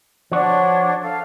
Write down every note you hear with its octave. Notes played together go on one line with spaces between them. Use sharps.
F3 D4 F#4 C#5
A4 F5